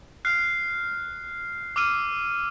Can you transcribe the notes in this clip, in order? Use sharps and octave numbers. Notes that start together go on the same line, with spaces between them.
F6 F#6 C7
D6 E6 F6 D#7